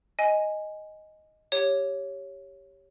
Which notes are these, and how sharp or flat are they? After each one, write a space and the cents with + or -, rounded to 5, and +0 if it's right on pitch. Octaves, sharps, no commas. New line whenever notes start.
D#5 +0 G#5 +0
G4 +0 C#5 +0